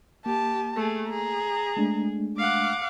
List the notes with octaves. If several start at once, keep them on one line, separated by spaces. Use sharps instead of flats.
A#3 G4 A5
A3 G#4
G#4 A#5
G#3 A3 D4
F5 F#5 D6